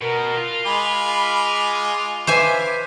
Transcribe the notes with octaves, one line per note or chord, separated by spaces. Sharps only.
B2 A#4
F4
G#3 G#5 B5 D6
B4 C5 E5 G#5 D6